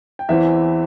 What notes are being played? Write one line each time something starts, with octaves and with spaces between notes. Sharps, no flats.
G5
E2 E3 C4 E4 E5